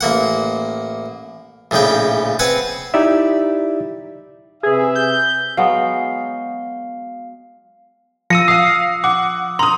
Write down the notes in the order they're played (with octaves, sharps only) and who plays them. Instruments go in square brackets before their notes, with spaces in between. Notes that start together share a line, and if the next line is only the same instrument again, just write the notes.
[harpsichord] A1 A#3 F#5
A#1 A2 C#3 D#4 G5
C4 B4 F#5 G#5
[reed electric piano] D#4 E4 G4 D5 E5
[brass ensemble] C3 B4 E5 [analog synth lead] G#4
[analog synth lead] G6
[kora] F#3 G#3 B3 [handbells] F5
[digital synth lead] F3 [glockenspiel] E6 C#7 [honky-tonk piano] A#6 D#7
[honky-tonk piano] F5 C7 [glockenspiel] D#6
[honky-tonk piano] F#5 [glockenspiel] D6
[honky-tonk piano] A#5 D#6 [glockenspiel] C6